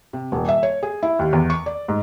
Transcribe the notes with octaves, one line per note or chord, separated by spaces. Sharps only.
C3
D#1
E5
C#5
G#4
E4
D#2
E2
C#6
D5
G#2